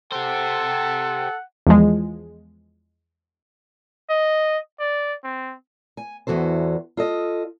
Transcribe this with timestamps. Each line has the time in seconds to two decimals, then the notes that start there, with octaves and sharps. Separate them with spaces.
0.12 G4 A4 C5 F#5
1.67 E2 F3 G#3
4.10 D#5
4.80 D5
5.24 C4
5.97 G#5
6.27 E2 E3 F#4 A4 C5
6.97 F4 A4 D#5